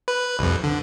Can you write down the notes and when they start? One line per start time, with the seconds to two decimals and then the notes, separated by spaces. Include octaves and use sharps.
0.08 B4
0.39 C2 F2
0.63 D3